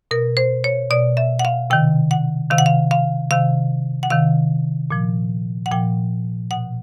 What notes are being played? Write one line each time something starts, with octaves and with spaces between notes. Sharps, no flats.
B2 A#4
C5
C#5
B2 D5
E5
F#5
F5
C3 D#3 G5
F#5
C3 D#3 F5
F#5
F5
F5
C3 D#3 F5
F#5
C3 D#3 F5
A#2 F3
F#5
A#2 F3 G5
B2 F#5